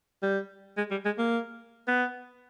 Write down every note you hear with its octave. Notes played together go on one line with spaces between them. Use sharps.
G3
G#3
G3
G#3
A#3
B3